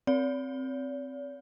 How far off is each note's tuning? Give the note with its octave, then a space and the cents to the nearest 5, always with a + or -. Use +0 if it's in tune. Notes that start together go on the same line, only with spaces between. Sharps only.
C4 +0 D5 -45